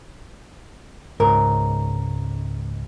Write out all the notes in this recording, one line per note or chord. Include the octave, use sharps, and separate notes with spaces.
C#2 G#2 A#4